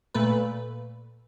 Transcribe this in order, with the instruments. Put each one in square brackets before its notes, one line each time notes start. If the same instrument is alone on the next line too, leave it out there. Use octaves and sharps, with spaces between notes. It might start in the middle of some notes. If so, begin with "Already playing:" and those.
[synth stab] A#2 A3 B4